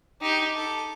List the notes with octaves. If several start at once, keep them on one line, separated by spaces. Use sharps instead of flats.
D#4 G4
A4